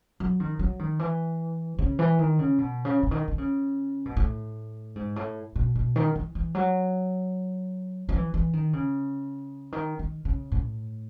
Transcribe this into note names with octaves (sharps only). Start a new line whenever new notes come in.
F#3
D#3
F#3
D#3
E3
C#3
E3
D#3
C#3
B2
C#3
C#3
D#3
D#3
C#3
B2
A2
G#2
A2
B2
B2
D#3
E3
E3
F#3
F#3
E3
E3
D#3
C#3
D#3
D#3
C#3
A2